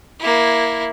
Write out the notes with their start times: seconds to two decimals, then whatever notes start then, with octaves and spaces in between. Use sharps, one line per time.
0.20 A#3 E4